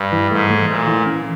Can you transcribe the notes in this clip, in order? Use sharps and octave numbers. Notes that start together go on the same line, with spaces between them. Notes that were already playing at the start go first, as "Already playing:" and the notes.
Already playing: G2
E3
G#2 A3
A3
A#2 A3
E3
C#4